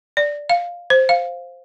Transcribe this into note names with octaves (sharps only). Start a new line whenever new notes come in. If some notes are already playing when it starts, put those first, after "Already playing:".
D5
F5
C5
F5